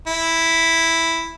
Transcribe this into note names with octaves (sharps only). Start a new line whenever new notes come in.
E4